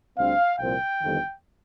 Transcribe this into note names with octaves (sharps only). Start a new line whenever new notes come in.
D2 D3 G3 C4 F5
C2 A#2 F3 C4 G5
G1 F2 D#3